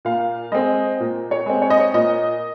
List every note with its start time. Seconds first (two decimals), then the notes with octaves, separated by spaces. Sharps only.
0.05 A#2 F5
0.52 G#3 C4 D#5
1.00 A#2
1.31 C#5
1.46 G#3 C4
1.62 C#5
1.70 D#5
1.79 C#5
1.94 A#2 D#5